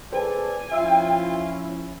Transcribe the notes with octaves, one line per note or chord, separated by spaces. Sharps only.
G#4 A4 B4 C5 D5 G#5
F3 C#4 E4 F4 E5 E6